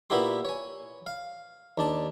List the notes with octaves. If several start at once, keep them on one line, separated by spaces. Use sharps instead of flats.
A#2 B3 E4 F#4 G4 C6
C#5 G#5
F5
D#2 D4 A5